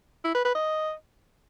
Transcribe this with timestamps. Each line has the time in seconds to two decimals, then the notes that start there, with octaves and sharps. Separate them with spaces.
0.24 E4
0.35 B4
0.45 B4
0.55 D#5